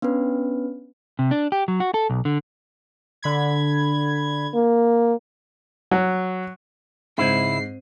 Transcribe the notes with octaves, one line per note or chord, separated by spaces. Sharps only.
B3 C#4 D4 B4
C3
D4
G4
F#3
F#4
A4
B1
D3
D3 B5 G#6
A#3
F#3
C#2 G#2 C4 E4 C5 G#6 C7 D#7